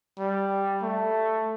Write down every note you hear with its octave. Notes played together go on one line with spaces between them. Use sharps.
G3
A3